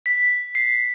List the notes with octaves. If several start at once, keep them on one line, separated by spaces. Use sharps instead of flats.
B6
C7